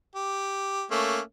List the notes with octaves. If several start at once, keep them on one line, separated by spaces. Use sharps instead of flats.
G4
A3 A#3 C#4